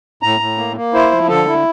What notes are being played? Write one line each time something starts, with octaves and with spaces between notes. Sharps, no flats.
A2 A#5
A2
A#3
A#3
E4 C5
F3
D3 A4
E4